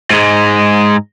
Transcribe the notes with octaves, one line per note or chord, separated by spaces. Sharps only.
G#2 G#3